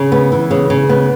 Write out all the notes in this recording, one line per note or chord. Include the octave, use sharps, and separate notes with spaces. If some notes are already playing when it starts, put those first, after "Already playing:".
Already playing: C#3
B3
E3
C#3
C#3
B3